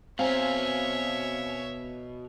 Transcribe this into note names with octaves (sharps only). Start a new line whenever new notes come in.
B2 C4 C#5 E5 F5 G#5 A#5